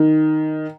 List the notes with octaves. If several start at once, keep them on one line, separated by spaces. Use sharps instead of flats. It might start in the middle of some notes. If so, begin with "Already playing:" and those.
Already playing: D#3